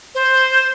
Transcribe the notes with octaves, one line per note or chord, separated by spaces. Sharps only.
C5